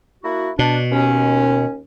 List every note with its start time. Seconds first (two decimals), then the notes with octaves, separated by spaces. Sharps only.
0.24 A#3 E4 F#4
0.59 B2 D4
0.91 D#2 C#4